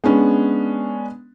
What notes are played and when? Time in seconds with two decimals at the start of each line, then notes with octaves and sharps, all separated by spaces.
0.04 G#3 B3 C#4 D4